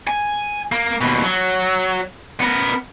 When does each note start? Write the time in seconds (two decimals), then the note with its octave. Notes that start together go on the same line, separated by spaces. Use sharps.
0.07 G#5
0.72 A#3
1.01 D#2 B2
1.23 F#3
2.41 B3 A#4